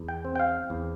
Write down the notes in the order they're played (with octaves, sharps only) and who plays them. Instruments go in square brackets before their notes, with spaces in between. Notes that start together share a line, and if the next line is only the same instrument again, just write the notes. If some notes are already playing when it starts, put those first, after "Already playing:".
Already playing: [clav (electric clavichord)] E2
G5
C4
G5
F5
E2